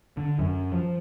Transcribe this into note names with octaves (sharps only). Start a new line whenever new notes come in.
D3
F#2
F3